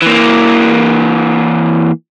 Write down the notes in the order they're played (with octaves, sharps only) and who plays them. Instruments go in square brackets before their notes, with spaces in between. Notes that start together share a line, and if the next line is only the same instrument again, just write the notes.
[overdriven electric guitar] E3 A#3